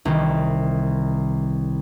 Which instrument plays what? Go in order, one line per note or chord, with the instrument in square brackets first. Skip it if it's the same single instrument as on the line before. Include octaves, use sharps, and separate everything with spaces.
[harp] C2 D#3